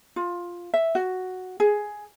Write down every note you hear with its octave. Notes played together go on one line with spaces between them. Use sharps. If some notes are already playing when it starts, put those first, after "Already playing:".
F4
E5
F#4
G#4